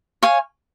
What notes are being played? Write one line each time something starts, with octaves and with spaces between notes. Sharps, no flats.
C#5 F5 G#5